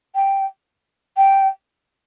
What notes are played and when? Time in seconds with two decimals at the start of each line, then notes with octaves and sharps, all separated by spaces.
0.15 G5
1.17 G5